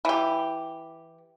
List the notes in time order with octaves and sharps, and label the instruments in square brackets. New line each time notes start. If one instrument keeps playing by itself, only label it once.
[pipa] E3 G4